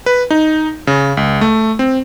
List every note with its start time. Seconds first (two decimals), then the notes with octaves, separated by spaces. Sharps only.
0.06 B4
0.30 D#4
0.87 C#3
1.17 C#2
1.41 A3
1.79 C4